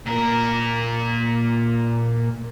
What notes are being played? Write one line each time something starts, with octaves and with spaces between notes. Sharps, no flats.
A#2 A#4